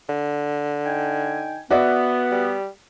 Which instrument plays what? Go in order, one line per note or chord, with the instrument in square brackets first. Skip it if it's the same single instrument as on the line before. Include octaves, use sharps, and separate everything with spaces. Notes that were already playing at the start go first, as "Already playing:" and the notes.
[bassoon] D3
[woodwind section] D#4 G5 G#5
[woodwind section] B3 [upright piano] F#4 D5 E5
[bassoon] G3